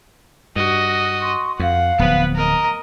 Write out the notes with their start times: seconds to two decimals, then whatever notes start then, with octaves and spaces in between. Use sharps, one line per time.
0.56 G2 F#4 D#5
1.20 C6 C#6
1.59 F2 F5 F#5
1.99 D1 F3 B3 B4
2.36 A#4 D#5 A#5